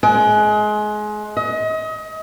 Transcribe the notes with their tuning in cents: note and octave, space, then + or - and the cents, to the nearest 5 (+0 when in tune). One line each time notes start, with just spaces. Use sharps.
G#3 +25
D#5 +30